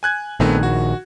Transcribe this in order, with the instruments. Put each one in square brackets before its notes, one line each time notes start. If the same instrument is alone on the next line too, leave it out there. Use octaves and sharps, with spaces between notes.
[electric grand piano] G#5 F#6 G#6
[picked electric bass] A#1 D#3 [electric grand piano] A3 B3 C4
[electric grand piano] F#4